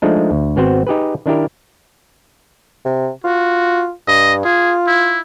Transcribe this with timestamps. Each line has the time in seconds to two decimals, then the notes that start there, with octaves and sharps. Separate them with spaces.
0.02 F3 G#3 A3 D4 D#4
0.31 D2
0.56 G#1 B3 C4 F#4 C5
0.87 D#4 G4 G#4 B4
1.26 D#3 D4 E4 G4 A#4
2.85 C3
3.24 F4 F#4
4.08 G2 D#5
4.45 F4 G#4
4.87 E4